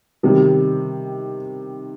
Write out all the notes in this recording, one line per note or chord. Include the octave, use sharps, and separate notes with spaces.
C3 D#3 G3